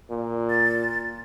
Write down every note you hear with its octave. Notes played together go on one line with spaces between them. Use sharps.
A#2
A6